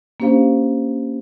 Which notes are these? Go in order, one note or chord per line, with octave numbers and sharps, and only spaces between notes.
A#3 C#4 D4 G4 C5 F5